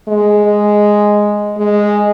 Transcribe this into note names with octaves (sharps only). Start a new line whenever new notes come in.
G#3
G#3